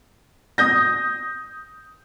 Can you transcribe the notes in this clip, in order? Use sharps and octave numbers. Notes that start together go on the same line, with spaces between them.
D#6 G6 A#6